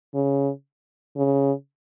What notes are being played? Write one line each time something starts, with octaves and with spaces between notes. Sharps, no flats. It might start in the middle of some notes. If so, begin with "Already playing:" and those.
C#3
C#3